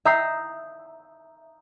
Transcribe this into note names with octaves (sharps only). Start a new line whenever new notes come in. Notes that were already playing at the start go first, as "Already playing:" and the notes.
E5 A#5 D#6 G6 C7